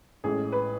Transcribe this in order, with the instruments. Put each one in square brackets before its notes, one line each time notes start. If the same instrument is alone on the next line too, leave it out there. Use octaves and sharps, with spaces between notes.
[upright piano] A1 A2 G#3 G#4
B4